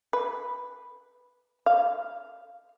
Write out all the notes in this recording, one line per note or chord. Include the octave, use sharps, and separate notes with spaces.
B4
F5